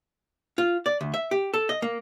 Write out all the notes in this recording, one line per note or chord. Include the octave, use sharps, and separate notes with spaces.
F4
D5
D2
E5
G4
A4
D#5
A#3